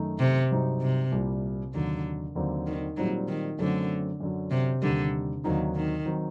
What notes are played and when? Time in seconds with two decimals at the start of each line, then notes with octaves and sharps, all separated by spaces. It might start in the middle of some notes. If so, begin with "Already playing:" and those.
Already playing: F#2 D#3 A3 D#4
0.19 C3
0.51 G2 F#3 C4 D#4
0.81 C3
1.12 C2 A#2 G3
1.74 D#2 D3 D#3 F#3
2.35 D#2 D3 F#3 C4 D#4
2.66 D#3
2.97 A#2 F#3 G3 C4 D#4
3.28 D#3
3.59 F#2 D3 F#3 A3 C4
4.20 F#2 D3 F#3
4.51 C3
4.82 D#2 D3 D#3 G3
5.44 D#2 D3 D#3 F#3 C4 D#4
5.75 D#3
6.06 D#3 F#3 C4 D#4